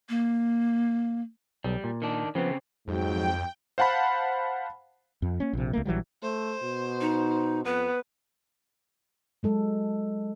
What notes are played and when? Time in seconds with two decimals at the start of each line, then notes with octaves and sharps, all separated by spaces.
0.09 A#3
1.64 B1 G3
1.84 A#2
2.02 D#3 D4
2.35 C#3 F3 B3 C4
2.88 F2 G#2 F#3 G5
3.78 C5 F5 F#5 A5 B5
5.22 F2
5.40 A#3 C#4
5.53 A#1 C3
5.73 C#2 A3 A#3
5.85 A#1 E3 F#3 G3
6.23 A3 C5
6.63 B2
7.01 D#4
7.65 F2 B3 B4
9.43 F#3 G#3 A4